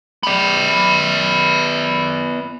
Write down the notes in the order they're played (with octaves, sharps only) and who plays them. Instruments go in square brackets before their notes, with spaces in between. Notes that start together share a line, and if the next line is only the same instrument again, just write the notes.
[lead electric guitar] B3 D5